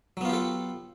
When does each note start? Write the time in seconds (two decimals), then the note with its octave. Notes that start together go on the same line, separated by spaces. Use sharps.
0.17 F#3
0.21 B3
0.25 F4
0.29 G4
0.33 A4